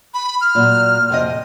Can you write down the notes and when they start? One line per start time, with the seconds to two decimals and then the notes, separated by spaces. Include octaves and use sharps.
0.14 B5
0.41 F6
0.55 A#2 F#3
1.10 F2 C3 D#5